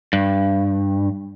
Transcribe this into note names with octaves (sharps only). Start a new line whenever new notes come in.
G2